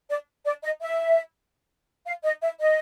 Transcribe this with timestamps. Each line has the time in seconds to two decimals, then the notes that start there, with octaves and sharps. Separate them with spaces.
0.10 D5
0.45 D5
0.63 D#5
0.82 E5
2.06 F5
2.24 D#5
2.42 E5
2.60 D#5